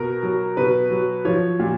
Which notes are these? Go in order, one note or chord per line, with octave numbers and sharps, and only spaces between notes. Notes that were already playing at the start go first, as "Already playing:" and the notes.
Already playing: B2 A#4
F#3
B2 B4
F#3
F3 C#5
A#2